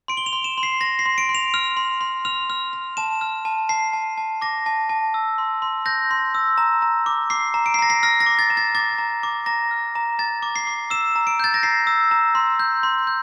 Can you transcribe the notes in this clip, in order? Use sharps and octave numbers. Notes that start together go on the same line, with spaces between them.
C6 D7
G7
F7
C6
E7
C6
C7
C6 A#6
C7
C6
D7
C6
F7
F6 F7
C6
C6
F6 F7
F6
F6
A5 E7
F6
A5
A5 C7
A5
A5
D6 A#6
A5
A5
E6
C6
C6
G6 A#6
C6
E6
A#5
A#5
D6
D6 C7
A#5
D7
C7
A#5 A#6
C7
F6 A#6
A#6
D6
A6
A#5
A6
D6 A6
A#5
D6
A#5 A#6
F6
A#5
A#5 A6
D6
C7
D6
E6 E7
A#5
D7
G6 A6
A#6
A#5 C7
E6
A#5
C6
G6
C6
G6